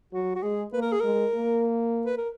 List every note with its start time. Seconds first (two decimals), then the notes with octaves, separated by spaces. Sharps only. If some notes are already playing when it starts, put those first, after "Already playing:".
0.13 F#3 F#4
0.35 F#4
0.42 G#3 G#4
0.73 A#3 B4
0.82 A#4
0.92 G#4
1.01 G#3 A#4
1.34 A#3
2.06 B4
2.18 A#4